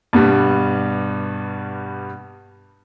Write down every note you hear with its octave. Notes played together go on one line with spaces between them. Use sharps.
G2 B2 G3